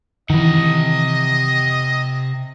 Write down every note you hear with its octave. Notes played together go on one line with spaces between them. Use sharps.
C3 D#3 E3 D#5 F#5